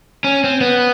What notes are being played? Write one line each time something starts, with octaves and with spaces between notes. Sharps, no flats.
C#4
C4
B3